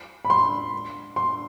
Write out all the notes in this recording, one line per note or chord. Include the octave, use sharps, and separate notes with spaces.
B5
C6
C6